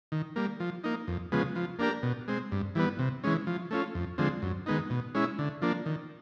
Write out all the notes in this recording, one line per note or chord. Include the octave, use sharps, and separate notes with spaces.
D#3
G3 A#3
F3
A#3 D#4
F2
C#3 F3 G#3 B3
F3
A#3 D4 G4 A#4
B2
G#3 C4
G2
E3 G3 B3
C3
E3 G#3 C#4
F3
A3 C#4 F4
F2
D3 F3 G#3 C4
F#2
D#3 G#3 B3 D#4
B2
G#3 C#4 E4
D3
F3 A#3 D4
D#3